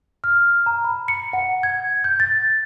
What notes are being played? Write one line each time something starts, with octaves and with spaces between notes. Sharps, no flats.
F6
A#5
B5
C#7
F#5
G#6
G6
A6